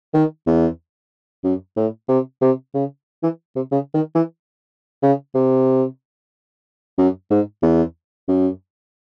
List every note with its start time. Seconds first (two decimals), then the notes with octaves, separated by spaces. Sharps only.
0.14 D#3
0.47 E2
1.44 F#2
1.77 A2
2.09 C3
2.41 C3
2.74 C#3
3.23 E3
3.56 C3
3.72 C#3
3.94 D#3
4.15 E3
5.03 C#3
5.35 C3
6.98 F#2
7.30 G#2
7.62 E2
8.28 F#2